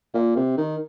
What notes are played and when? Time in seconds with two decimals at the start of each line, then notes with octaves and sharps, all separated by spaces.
0.14 A#2
0.36 C3
0.57 D#3